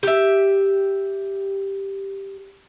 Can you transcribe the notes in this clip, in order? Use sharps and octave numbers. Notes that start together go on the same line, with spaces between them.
G4 E5